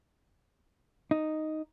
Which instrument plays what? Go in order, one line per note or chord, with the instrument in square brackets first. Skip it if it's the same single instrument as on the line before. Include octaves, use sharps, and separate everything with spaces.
[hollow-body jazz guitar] D#4